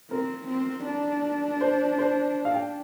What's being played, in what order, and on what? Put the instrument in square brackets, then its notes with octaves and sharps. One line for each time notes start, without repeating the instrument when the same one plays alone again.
[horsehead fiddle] C4 [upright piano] A#4
[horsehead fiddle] C4
D4
[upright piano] C5
C5
F5
G5